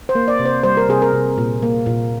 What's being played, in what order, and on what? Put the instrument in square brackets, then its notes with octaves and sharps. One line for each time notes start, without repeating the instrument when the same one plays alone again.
[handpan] C5
A#3
D5
C3
C5
G3 C5
A#4
C3 G#4
A#4
C3
A#2
A#3
A#2